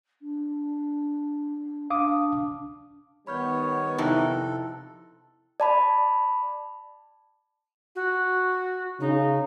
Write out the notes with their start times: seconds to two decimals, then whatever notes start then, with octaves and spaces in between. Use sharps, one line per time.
0.22 D4
1.90 D4 F5 D6 D#6
3.27 D#3 G3 B3 C#5 B5 F6 G6
3.98 F2 C3 D#4 E4 A4 F#6
5.60 D5 A5 B5
7.96 F#4
9.00 C#3 D#4